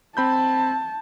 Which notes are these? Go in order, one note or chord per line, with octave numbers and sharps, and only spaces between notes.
C4 A5 B5 G6